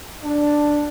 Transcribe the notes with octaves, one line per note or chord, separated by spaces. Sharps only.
D4